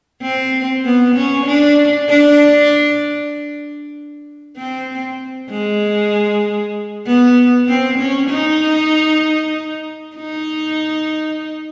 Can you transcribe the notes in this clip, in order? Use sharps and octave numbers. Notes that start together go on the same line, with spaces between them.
C4
B3
C#4
D4
D4
C4
G#3
B3
C4
C#4
D#4
D#4